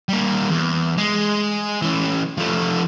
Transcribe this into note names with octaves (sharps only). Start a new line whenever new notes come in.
G3 A#3
E2
G#3
E3 C#4
F3 A3